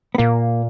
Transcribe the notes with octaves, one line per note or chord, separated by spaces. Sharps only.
B3
A#2 A#3